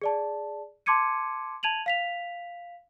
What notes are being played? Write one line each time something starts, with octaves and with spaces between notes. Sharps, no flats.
G#4 D5 A5
A5 C6 D6 G#6 C#7 D#7
A5 G#6 D#7 F7 F#7
F5 B6 F7